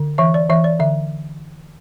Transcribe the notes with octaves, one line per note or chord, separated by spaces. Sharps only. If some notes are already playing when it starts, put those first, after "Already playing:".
Already playing: D3
E3 E5
D5
E3 E5
D5
D3 E5